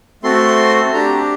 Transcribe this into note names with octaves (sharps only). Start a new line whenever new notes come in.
A3 C4 F#4 A4 C6
D4 G4 A#5